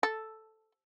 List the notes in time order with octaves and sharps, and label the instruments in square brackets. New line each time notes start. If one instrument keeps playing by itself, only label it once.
[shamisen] A4